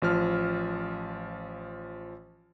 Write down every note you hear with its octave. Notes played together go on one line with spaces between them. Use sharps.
A1 F3 F6